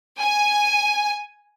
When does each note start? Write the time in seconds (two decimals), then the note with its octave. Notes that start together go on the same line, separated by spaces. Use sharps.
0.19 G#5